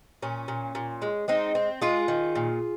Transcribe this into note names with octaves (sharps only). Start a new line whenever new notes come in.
A#2 C#4
A#2
A#2
G#3
G#3 C4 D#4
C4
G#3 F4 G#4
D#3
A#2